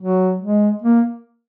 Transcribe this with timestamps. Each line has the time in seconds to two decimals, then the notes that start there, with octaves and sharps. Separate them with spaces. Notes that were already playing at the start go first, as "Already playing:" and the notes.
0.02 F#3
0.42 G#3
0.82 A#3